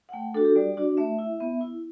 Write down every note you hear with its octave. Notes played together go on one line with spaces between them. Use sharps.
F#5
A3 G5
D4 F#4 A4
G4
G3 D5
D4 F#4
A3 E5
E4
B3
E4